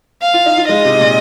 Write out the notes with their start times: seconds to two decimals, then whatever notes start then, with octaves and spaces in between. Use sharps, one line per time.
0.22 F5
0.34 F4
0.46 D#4
0.58 F4
0.68 G#3 D#5
0.85 C3
1.01 A#2